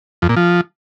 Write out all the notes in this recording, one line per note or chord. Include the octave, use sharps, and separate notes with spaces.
F2
A#2
F3